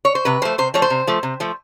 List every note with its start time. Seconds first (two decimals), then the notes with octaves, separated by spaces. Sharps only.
0.05 C#5
0.15 C5
0.25 C3 B4
0.42 F3 A3 C5
0.58 C3 C5
0.74 F3 A3 C#5
0.82 C5
0.90 C3
1.07 F3 A3
1.23 C3
1.40 F3 A3